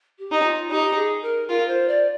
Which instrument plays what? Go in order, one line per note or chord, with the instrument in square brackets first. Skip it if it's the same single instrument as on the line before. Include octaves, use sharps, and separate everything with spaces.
[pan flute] G4
[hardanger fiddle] D#4
[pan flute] F4
[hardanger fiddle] D#4 [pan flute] G4
[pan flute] G#4
A#4
[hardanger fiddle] F4 [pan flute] A#4
[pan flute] C5
D5